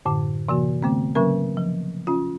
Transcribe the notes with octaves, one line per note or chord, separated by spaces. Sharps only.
F#2 A2 D3
C3 E3 A#3 F#4
D3 A3 B3 C4
C#3 F#3 A#3 C#4 A#4
F3
C#4 F4